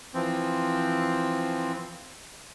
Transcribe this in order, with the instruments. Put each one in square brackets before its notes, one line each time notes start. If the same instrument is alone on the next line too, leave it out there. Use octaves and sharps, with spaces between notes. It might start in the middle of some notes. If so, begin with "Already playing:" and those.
[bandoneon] E3 F3 C4